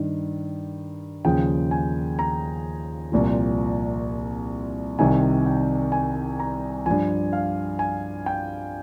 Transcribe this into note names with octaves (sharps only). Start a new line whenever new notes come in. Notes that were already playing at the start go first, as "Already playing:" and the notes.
Already playing: G2 D#3
D#2 C#3 F3 G5
G#5
A#5
C2 A#2 F3
C2 C3 D#3 G#5
G5
G#5
A#5
G2 F3 G#5
F5
G#5
G5